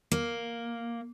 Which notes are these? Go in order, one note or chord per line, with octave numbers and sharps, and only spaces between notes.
A#3